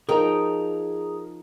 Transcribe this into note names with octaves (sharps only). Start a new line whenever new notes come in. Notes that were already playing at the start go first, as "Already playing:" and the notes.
F3 D#4 G#4 A#4 G5 A#5